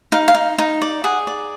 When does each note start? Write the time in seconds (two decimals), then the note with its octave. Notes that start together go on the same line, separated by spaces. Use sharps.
0.12 D#4 F5
0.28 F5
0.34 D#4
0.58 D#4
0.82 D5
1.04 G#4 F#5
1.27 D5